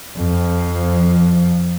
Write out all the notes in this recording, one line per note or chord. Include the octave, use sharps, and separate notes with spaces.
F2 F3